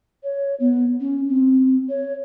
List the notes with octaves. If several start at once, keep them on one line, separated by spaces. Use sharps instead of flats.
C#5
B3
C#4
C4
C#5